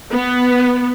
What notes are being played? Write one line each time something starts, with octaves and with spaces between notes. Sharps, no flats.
B3